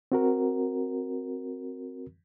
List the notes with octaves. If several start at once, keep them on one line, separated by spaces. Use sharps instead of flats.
C4 F#4 A#4